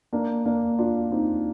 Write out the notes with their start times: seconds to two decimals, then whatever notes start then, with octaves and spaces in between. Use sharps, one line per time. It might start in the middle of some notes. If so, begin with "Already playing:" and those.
0.13 A#3 D4
0.46 A#3 D4
0.79 D4 F4
1.12 C4 D#4